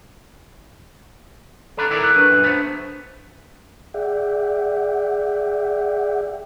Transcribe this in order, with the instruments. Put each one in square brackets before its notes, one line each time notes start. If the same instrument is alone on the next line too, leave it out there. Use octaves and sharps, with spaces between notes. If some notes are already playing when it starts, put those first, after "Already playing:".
[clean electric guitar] C#4 D4 B4 [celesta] A4 A#5
[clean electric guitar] D#3 E4 D5 [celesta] A4 A#4
[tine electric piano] F#6
[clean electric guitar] F#3 [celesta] D4 B4 D#7
[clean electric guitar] F#2 A#2
[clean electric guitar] A3 B3 [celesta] D4 C5
[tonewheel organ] G#4 D5 E5 F#5 G5